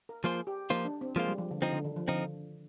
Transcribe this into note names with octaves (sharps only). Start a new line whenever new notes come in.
A#4
F3 A#3 F4 G#4 C5
G4
F3 A#3 D#4 F4 C5
D4
C4
F3 G#3 A#3 F4 C5
G3
F3
D3
D3 F3 C4 D#4
D3
D#3
F3
D3 F3 C4 D#4